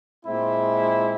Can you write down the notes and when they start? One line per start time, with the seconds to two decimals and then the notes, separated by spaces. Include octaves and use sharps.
0.24 A#2 G#3 C4 E4